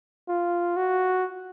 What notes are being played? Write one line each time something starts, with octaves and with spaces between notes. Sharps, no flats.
F4
F#4